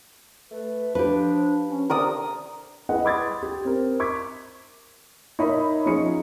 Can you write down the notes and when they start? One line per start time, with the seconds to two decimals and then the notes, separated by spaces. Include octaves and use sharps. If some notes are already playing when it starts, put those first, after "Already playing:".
0.51 A3 B4
0.95 F3 D4 G4 B4
1.70 C#4
1.90 C3 D#3 D4 A#4 D5 D#6
2.89 E4 G#4 B4 D#5 F#5
3.05 B5 C6 D6 D#6 G#6 A6
3.43 G4
3.65 C4 A#4
4.00 C#6 D6 G#6 B6
5.39 D#4 A#4 C#5 E5 B5
5.86 F3 C#4 D#4 G#4 C#7